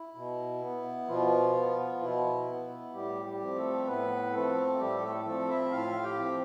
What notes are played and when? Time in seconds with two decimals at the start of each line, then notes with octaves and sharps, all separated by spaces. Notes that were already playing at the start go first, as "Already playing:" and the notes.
Already playing: E4
0.15 B2
0.62 B3
1.08 B2 F3 F4
1.55 B3
2.00 B2 E4
2.48 B3
2.93 A2 G3 G4
3.24 G3 G4
3.41 F3 C4
3.56 A3 A4
3.86 A2 B3 B4
4.32 F3 A3 C4 A4
4.79 A2 G3 G4
5.02 A3 A4
5.25 F3 A3 C4 A4
5.48 E4 E5
5.72 A2 F4 F5
6.03 G4 G5
6.19 F3 C4